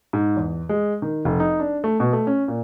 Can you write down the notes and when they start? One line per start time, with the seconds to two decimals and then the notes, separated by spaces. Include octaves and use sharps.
0.13 G#2
0.37 E2
0.69 G#3
1.02 D#3
1.25 F1
1.40 D#4
1.60 D4
1.84 A3
2.00 B2
2.13 A3
2.27 C#4
2.48 A#2